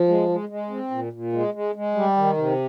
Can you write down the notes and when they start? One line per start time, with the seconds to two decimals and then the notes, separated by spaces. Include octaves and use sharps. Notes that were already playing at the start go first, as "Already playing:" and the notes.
Already playing: F3
0.08 G#3
0.29 G#3
0.49 G#3
0.70 C4
0.91 A#2
1.13 A#2
1.33 G#3
1.54 G#3
1.75 G#3
1.95 G3
2.17 D#3
2.37 C3